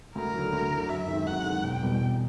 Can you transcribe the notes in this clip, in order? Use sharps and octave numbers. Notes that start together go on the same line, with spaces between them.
D2 A#4
D3 F#3
D2
D3 F#3
F#2 E5
D#3 G#3 C4
F#2 F#5
D#3 G#3 C4
E1 G5
E2 B2 G3
E1